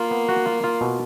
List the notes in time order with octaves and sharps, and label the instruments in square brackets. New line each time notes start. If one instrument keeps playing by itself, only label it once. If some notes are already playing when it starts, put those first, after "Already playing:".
Already playing: [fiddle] A#3 [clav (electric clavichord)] F4
[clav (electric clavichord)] B3
F#4
F4
F4
B2